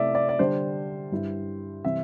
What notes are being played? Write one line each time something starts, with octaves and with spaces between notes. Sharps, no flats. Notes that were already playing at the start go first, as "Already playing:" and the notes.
Already playing: C3 A3 E4 D5 E5
D5
D5
D3 G3 D4 C5
G2 G3 E4
C3 E3 G3 C4 E5